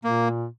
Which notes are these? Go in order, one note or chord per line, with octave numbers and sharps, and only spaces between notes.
A#2 A#3